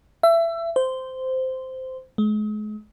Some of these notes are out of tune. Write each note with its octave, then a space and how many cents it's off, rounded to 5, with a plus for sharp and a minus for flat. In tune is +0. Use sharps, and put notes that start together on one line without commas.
E5 +25
C5 -10
G#3 +40